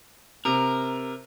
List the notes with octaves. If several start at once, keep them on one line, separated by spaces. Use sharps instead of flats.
C3 A#4